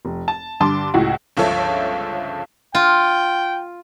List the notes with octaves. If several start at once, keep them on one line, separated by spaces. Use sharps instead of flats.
F1
A5
G2 D3 A5 C6 D6
C#2 A2 F#4
G1 C#2 F3 A4 C#5 E5
F4 G5